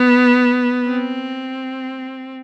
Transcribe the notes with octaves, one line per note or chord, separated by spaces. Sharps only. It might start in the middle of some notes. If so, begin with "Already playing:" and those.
Already playing: B3
C4